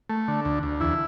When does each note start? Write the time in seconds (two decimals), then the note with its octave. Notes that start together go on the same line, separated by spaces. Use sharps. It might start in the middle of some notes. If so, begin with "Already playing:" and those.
0.10 A3
0.28 D3
0.45 D2
0.63 D2
0.80 E2 E4